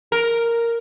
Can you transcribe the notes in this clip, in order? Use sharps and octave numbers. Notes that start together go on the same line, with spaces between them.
A#4